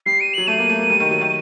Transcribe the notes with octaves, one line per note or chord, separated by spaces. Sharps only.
G3 C7
D#7
F#3 F#7
A3 D#7
A#3
A3
A#3
G3
D#3
F#3
D#3